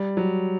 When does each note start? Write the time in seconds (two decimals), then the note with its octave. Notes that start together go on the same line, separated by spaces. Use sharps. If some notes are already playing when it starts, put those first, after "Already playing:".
Already playing: G3
0.17 F#3